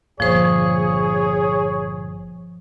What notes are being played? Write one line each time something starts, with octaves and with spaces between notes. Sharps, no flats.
G1 A#2 F3 G#4 C5 C#5